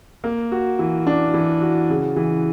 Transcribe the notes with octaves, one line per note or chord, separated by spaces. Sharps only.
A#3
F#4
E3
D4
E3
F#4
C#3
E3